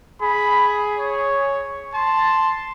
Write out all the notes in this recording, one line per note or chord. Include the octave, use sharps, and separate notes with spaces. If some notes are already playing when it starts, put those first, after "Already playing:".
G#4 B5
C#5
A5 C6